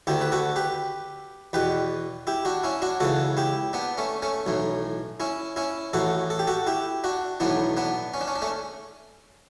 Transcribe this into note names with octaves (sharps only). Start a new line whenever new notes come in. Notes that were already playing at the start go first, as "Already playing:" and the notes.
D2 D3 E4 G4
B4
F#4 A4
G4 B4
E2 B2 G4 B4
E4 G4
D4 F#4
C#4 E4
D4 F#4
C#2 C#3 E3 F#4 A4
E4 G4
B3 D4
A3 C#4
A3 C#4
B1 A2 E3
C#4 E4
C#4 E4
A1 A2 E3 F#4 A4
A4
G4
F#4 A4
E4 G4
D4 F#4
B1 A2 E3 B3 D4
B3 D4
C#4
D4
C#4
D4
A3 C#4